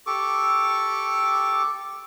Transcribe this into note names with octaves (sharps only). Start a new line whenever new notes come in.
G4 A4 C#6 D6